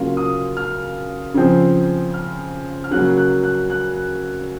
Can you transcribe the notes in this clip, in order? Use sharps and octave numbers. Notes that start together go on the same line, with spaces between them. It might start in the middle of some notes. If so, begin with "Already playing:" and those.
Already playing: C#3 F#3 A#3 F4 F5
D#6
F6
C#3 F3 C4
F6
F6
C#3 F#3 A#3 F#6
F#6
F#6
F#6